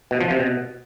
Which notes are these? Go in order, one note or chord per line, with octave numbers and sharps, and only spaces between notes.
B2
F3
C3
B2